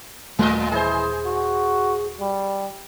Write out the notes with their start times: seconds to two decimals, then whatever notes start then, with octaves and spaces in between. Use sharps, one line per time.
0.39 D#1 A2 A3 D#5
0.72 E3 G#4 C5
1.26 F#4
2.20 G3